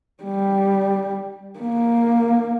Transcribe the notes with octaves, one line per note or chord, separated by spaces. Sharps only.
G3
A#3